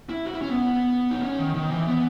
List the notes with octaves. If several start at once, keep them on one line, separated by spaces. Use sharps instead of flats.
E4
F#4
E4
C#4
B3
D#4
C#4
D#3
D#3
E3
B3